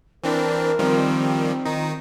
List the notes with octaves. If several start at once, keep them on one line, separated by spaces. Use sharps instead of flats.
E3 C4 D4 A#4
D#3 F3 G3 C4
D#3 D#4 F4